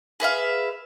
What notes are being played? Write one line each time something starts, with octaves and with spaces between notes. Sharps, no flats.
G#4 B4 E5 F5